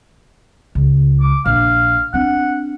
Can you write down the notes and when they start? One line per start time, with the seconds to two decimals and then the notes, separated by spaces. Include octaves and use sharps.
0.75 C#2
1.20 D6
1.46 A#1 F5
2.14 C4 D4 F#5